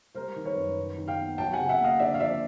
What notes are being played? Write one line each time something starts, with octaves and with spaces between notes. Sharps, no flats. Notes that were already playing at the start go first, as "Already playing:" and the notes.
G3 A#4 C5
D#3
B4 C#5
F#2
D#3
D#3
F5 G5
B3
F#3 G5 A5
F#5 G#5
C#3
E5 F#5
A#3 D#5 F5
D3 D5 E5
F5
F3 D5 E5